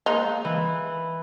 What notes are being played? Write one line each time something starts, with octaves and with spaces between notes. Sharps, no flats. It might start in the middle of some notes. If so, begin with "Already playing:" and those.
G#3 A#3 D#4
E3